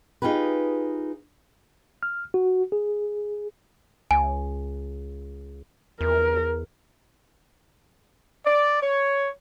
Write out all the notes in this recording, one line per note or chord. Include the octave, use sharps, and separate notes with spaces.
D#4 F4 G4 G#4 B4
F6
F#4
G#4
C#2 G#5
E2 A#4
D5
C#5